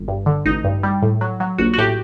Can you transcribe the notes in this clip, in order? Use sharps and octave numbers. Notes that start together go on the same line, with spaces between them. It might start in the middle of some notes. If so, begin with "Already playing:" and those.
Already playing: G1
G2
D3
A1 D#4
G2
G3
A2
F#3
F#3
A#1 F#4
F#4
A2 G4